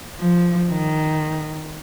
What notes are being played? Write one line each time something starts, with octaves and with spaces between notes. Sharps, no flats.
F3
D#3